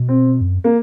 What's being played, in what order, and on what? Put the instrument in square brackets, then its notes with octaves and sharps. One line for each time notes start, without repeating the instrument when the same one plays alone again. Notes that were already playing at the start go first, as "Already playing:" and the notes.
Already playing: [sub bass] B2
[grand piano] C4
[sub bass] F#2
[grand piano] A#3